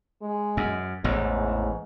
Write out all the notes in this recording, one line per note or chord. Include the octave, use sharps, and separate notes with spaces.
G#3
F#2
A1 E2 G#2